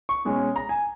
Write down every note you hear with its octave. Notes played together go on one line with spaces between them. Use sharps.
C#6
B2 G#3 C#4
A#5
G#5